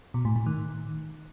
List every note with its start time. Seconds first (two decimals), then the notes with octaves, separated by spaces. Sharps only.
0.14 B2
0.25 A2
0.36 A2
0.46 D#3